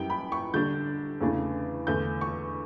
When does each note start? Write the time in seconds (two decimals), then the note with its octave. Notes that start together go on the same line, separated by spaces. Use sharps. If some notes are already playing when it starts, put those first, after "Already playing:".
Already playing: F#2 E3 G3 G5
0.10 B5
0.32 C#6
0.54 D3 G3 D4 G6
1.21 E2 C#3 E3 A3 D4
1.87 E2 D3 A3 G6
2.21 C#6